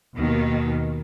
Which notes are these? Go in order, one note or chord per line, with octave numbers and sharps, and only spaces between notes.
D#2 B2 D#3